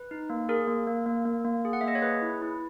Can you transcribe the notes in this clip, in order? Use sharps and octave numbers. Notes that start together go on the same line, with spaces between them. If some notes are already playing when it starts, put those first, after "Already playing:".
Already playing: B4
D#4
A#3
G#4 A#4
A#3
A#3
A#3
A#3
A#3
G#4
F#5
E5
A#3 D#5
C#5
G#4 B4
E4
E4